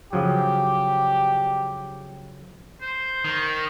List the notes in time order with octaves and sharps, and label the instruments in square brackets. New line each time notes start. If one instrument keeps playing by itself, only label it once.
[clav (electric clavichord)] C#3 F3 F#3 [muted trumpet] G4
[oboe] C5
[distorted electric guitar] D#3